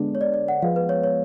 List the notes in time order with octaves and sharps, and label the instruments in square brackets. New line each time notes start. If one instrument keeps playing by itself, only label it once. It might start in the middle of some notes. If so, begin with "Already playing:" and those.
Already playing: [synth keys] D3 G#3 B3 D4
[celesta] C#5
D5
D5
F#5
[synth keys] F3 G#3 B3 [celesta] F5
[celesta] B4
C#5
C#5